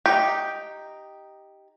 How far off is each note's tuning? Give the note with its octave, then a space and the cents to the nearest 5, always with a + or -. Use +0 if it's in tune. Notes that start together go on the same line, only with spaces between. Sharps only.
D#4 +0 G4 +0